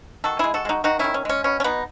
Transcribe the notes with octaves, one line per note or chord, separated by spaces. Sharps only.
D#3 F#4 A4
G#3 E4 G#4
F#4 A4
G#3 D#4 F#4
D#3 D#4 F#4
D#3 C#4 E4
C#4
G#3 C#4
B2 C#4
C#4
B2 B3 D#4